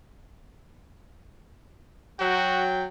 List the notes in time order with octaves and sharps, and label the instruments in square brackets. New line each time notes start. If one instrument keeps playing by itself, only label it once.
[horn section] F#3 G5 [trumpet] F#4